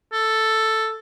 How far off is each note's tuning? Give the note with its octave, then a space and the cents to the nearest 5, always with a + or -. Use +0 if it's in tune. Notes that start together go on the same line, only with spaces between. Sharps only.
A4 +5